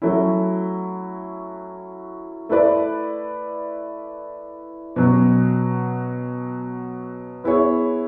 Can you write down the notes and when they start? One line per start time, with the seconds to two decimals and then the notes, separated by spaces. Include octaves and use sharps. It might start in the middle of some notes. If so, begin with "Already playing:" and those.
0.02 F#3 A3 C#4 E4
2.49 A3 E4 B4 D5
4.96 B2 F#3 C#4
7.44 B3 E4 G#4 C#5